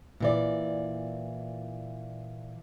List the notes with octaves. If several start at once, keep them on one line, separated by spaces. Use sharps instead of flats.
A#2 E3 D5